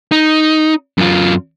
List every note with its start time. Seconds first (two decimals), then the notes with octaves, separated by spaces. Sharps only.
0.11 D#4
0.98 F#2 F4